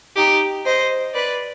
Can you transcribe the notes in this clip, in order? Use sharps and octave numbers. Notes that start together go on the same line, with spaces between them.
D#4 G4
C5 D#5
B4 D5